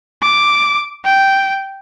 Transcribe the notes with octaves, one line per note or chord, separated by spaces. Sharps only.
D6
G5